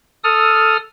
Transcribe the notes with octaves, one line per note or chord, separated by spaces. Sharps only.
A4 D#6 F6